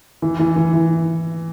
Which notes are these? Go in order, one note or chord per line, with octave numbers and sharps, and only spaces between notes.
E3
E3
E3
E3